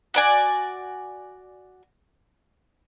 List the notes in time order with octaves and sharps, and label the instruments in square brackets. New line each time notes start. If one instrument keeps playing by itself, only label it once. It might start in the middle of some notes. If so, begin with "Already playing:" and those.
[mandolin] F#4 D5 G#5